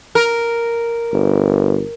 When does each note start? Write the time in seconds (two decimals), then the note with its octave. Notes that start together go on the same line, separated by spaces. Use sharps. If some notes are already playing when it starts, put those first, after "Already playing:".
0.15 A#4
1.13 G1